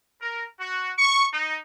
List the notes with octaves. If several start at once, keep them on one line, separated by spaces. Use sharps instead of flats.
A#4
F#4
C#6
D#4